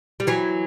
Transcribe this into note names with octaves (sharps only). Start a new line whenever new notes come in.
G3
E3 F#3